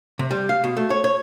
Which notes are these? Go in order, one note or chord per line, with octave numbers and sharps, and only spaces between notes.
C3
G3
F5
B2
A3
C#5
C#5